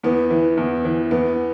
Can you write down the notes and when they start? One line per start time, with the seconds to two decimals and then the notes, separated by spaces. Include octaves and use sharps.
0.03 E2 B3
0.30 E3
0.57 E2
0.85 E3
1.11 E2 B3